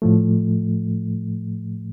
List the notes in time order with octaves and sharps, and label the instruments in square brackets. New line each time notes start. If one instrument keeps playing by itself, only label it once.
[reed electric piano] A2 F3 A3